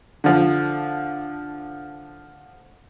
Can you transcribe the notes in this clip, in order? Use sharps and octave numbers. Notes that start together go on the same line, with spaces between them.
D3 F3